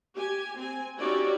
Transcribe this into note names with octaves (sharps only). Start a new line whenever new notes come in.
G4 G#5
C4 G#5
C#4 D#4 E4 F#4 G4 D5